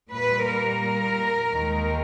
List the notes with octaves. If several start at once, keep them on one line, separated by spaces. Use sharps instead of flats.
A#2 G3 B4
A#4
D#2 D#3 G#3